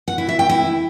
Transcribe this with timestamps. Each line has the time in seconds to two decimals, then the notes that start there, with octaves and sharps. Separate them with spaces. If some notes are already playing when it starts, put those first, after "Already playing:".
0.08 F#5
0.18 E4
0.29 E5
0.39 G5
0.50 E4